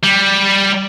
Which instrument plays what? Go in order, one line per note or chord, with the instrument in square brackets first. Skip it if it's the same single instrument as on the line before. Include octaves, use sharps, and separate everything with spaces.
[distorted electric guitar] G3